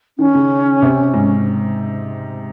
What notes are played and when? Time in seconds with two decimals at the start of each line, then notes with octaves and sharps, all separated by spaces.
0.18 D#3 C#4
0.34 C#3
0.82 C3
1.14 G#2